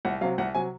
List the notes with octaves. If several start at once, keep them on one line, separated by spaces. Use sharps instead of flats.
C2 F#5
C3 F#3 F5
C2 F#5
C3 F#3 G#5